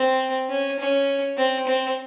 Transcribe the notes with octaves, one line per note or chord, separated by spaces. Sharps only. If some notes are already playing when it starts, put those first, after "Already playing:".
Already playing: C4
C#4
C#4
C4
C4